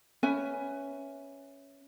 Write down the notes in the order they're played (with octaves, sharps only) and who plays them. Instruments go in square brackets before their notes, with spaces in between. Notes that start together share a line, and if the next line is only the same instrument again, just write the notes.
[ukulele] C#4 B4 E5 G#5